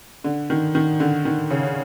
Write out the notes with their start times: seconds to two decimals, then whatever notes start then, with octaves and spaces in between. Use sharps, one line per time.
0.24 D3
0.50 D#3
0.75 D#3
1.00 D3
1.25 D#3
1.50 C#3